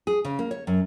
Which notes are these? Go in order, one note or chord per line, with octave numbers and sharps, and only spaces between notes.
G#4
C#3
A#3
C#5
F#2